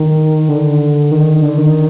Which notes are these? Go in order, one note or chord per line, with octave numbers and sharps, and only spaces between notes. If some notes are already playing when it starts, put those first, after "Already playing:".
Already playing: D#3
D3
D#3
D3
D#3